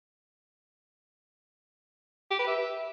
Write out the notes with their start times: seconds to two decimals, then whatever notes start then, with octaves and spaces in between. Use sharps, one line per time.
2.31 G4
2.39 B4
2.47 E5